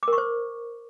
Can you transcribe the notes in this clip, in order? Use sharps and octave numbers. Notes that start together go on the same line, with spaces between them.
D6
A#4
C#6
C5